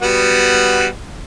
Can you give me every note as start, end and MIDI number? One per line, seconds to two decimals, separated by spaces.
0.02 0.87 55
0.02 0.87 59
0.02 0.87 66